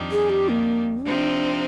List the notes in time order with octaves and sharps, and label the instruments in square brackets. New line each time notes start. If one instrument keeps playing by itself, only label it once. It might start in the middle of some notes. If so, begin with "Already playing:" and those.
Already playing: [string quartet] F2 D#3 G3 D4
[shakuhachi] G#4
G4
A#3
[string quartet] C3 F3 C4 D#4 [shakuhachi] D4